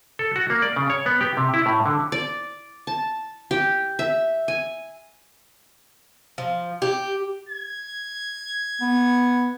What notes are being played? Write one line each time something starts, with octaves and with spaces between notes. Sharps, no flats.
A4
F#4
A#3
D5
C#3
C#5
B3
G4
C3
E4
A2
D3
D5
A5
G4
E5
G#5
F3
G4
G#6
B3